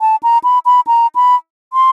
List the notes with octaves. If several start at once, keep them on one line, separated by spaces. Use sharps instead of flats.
A5
A#5
B5
B5
A#5
B5
C6